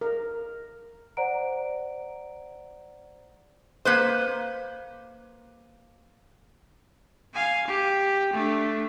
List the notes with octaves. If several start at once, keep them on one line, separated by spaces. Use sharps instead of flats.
A#4
C5 D5 F#5 A#5 D7
A#3 B4 C5
F5 G#5
G4
A3 D4